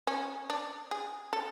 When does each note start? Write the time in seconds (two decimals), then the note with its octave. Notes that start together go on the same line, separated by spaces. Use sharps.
0.07 C#4
0.50 D4
0.91 G#4
1.33 A4